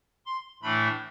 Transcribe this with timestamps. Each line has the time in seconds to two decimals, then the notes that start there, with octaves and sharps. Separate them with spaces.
0.26 C6
0.62 A2 E3 A3 D4 B5